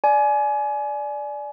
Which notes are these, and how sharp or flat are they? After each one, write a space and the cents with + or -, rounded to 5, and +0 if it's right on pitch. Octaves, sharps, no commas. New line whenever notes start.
D5 +0 G#5 +25